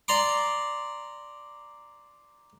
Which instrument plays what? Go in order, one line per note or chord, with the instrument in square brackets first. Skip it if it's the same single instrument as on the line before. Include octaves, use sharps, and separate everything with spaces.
[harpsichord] D5 A#5 C6 D6